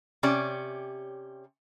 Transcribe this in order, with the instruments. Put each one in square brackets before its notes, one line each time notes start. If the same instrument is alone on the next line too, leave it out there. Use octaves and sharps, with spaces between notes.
[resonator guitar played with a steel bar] C3 C#4 G4 D5